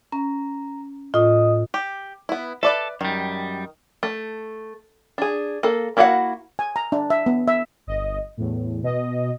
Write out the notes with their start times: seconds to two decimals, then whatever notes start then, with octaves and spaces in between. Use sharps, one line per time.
0.12 C#4 A#5
1.14 A2 F4 D#5 D#6
1.74 G4
2.29 B3 E4
2.63 A4 B4 D5 E5
3.01 F#2 D#3 G3
4.03 A3
5.18 D4 G#4
5.63 A#3 A4
5.97 A#3 E4 F#4 F5 F#5
6.59 G#5
6.76 A#5
6.92 D4
7.10 E5
7.26 B3
7.48 E5
7.87 G1 D#5
8.37 E2 A2
8.82 B2 D#5